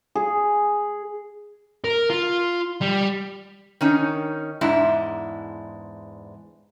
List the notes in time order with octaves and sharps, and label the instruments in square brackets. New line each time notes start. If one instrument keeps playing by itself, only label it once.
[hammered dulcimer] G#4
[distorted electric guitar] A#4
F4
G3
[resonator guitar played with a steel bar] D#3 C#4 D#4
E2 G#2 G#3 D4 E4